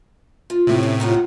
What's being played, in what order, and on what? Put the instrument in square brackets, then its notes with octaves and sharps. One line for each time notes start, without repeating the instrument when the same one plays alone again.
[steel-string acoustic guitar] F4
[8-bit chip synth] A2 C3
[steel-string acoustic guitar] C#4
D#4 F4 F#5